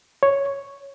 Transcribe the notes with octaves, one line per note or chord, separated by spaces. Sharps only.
C#5